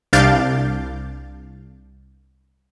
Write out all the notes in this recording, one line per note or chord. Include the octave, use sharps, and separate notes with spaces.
C2 D4 F5 D6 G6 A6